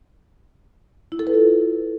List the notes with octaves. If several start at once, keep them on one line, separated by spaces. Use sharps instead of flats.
E4
A4
B4
F4